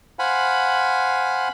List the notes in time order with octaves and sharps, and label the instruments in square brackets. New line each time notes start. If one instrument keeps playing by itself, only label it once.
[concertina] C5 F5 F#5 G#5 B5